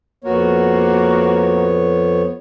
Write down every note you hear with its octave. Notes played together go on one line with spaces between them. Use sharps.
F2 A#3 B3 F#4 C#5